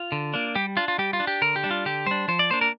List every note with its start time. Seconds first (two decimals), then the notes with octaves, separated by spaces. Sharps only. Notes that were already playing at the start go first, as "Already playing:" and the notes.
Already playing: F4
0.12 D3
0.34 A#3 D4
0.55 G3 G4
0.77 D4 F4
0.88 F4
0.98 G3 G4
1.13 F4
1.20 D4
1.27 G4
1.42 D3 A#4
1.56 G4
1.64 G3 D4
1.71 F4
1.85 D3 G4
2.06 G3 D4 C5
2.28 F3 C5
2.39 D5
2.50 A#3 D4 C5
2.61 A#4